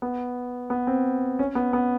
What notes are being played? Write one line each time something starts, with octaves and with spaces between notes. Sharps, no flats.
B3
B3
C4
C#4
B3
B3